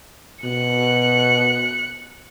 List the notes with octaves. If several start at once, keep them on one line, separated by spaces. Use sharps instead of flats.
B2 F#6 C#7